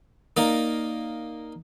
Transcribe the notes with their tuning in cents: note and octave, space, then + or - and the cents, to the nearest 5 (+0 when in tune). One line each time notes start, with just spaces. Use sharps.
A#3 +0 D#4 +0 D5 +0